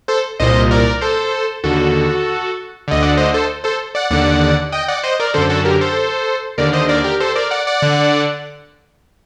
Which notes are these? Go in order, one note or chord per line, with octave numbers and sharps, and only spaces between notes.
A4 C5
C2 A#2 C5 D#5
A#4 D5
A4 C5
D#2 D3 F#4 A4
D2 D3 D#5
D5 F#5
C5 D#5
A4 C5
A4 C5
D5 F#5
D#2 D3 D5 F#5
D#5 G5
D5 F#5
C5 D#5
A#4 D5
F#2 D3 A4 C5
F#4 A4
G4 A#4
A4 C5
D#2 D3 A#4 D5
C5 D#5
A#4 D5
G4 A#4
A4 C5
A#4 D5
D5 F#5
D5 F#5
D3